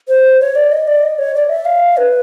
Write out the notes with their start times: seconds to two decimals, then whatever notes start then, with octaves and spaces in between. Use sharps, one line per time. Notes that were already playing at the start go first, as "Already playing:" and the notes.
0.08 C5
0.40 C#5
0.55 D5
0.71 D#5
0.88 D5
1.03 D#5
1.19 C#5
1.35 D5
1.49 E5
1.65 F5
1.97 B4